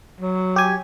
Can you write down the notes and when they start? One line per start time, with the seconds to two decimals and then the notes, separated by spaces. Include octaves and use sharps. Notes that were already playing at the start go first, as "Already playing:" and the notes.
0.21 F#3
0.56 G4 G#5